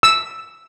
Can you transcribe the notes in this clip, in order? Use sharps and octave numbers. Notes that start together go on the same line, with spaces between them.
E6